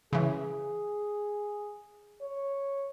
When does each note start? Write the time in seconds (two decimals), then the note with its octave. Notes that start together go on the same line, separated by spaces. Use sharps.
0.13 C#3 E3 G#4
2.21 C#5